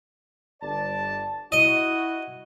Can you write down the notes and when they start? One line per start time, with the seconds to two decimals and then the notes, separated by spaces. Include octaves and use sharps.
0.62 G1 D5 A5
1.52 E4 F#4 D#5